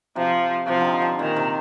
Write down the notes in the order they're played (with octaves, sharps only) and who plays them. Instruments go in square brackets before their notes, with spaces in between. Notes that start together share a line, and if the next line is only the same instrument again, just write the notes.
[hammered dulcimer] C3 [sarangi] F3
[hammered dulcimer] C3 [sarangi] F3
[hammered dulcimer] D3 D#3
D3
[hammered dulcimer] A#2 [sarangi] D#3
[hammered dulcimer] C3